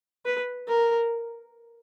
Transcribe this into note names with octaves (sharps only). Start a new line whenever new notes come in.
B4
A#4